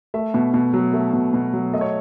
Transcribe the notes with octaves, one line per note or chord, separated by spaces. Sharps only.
A3 E5
B2
B2
F#3
A3
B2
B2
F#3
A3 D#5
C#5